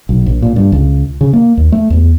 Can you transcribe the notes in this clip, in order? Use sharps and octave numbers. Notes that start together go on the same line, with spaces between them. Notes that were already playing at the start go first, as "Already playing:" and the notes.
B1
A#1
A#2
G2
C#2
C#3
A#3
D#2
A3
E2